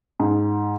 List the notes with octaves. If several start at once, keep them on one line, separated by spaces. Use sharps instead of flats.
G#2